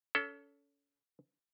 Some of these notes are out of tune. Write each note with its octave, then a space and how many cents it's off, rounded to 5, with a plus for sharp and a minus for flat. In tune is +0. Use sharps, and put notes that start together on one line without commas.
C#4 +30 A4 +0